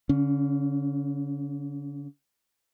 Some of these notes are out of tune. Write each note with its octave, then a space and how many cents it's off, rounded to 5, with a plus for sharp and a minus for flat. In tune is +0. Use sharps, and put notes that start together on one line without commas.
D3 -45 C#4 +0